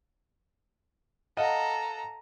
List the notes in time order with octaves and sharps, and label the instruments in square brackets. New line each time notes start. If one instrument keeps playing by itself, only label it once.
[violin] A4 A#5 [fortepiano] D#5 F5 F#5